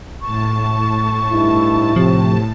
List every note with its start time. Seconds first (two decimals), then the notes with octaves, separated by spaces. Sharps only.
0.21 A2 A5 C#6
1.31 G2 D#4 E4
1.96 C3 F3